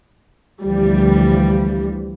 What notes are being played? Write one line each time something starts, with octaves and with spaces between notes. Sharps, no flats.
D2 E3 F3 G3